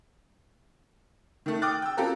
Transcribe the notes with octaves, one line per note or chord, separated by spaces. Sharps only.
D#3 A3
G5 D6 D#6 F6 F#6 A6
G5 E6
C4 F4 G4 A4 A#4